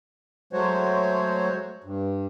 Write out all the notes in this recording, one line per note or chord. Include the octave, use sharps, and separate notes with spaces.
F#3 G#3 A3 F#4 C5 C#5
G2